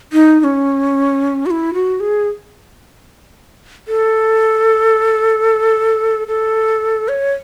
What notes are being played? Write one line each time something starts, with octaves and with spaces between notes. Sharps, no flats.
D#4
D#4
C#4
F#4
E4
F#4
G#4
A4
A4
C#5